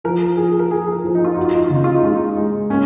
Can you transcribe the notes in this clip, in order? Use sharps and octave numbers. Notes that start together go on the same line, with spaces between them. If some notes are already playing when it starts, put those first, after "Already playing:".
F3 A#4
F3 G#4
A#4
F3 G#4
A#4
F3
D#4
F4
D#4 F#4
F4
D#4
F4
C#3 D#4
F4
D#4
G#3 F4
D#4
G#3
A#3 C#4